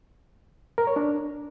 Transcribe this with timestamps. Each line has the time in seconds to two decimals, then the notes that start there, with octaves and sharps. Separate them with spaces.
0.78 A#4
0.87 C#5
0.96 D4